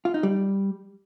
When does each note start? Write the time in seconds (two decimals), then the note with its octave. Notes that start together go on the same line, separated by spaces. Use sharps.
0.05 F4
0.14 D#4
0.23 G3